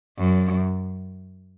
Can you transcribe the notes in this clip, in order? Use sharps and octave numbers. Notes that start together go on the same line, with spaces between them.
F#2